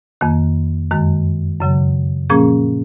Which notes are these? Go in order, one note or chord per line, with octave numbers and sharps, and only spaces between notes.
F2 D#3 A#3
F#2 D#3 G#3
F#2 C#3 F#3
A#2 F3 A#3 C#4 G#4